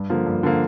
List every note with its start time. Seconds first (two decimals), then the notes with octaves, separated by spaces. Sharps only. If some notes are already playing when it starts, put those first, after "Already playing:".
Already playing: G2
0.10 D3 F3 A#3
0.26 G2
0.43 D3 F3 A#3